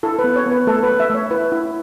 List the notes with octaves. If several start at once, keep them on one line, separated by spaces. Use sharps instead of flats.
E4 A4
B4
B3
C#5
B3
B4
A3 A4
A3 B4
E5
A3 C#5
E4 B4
E4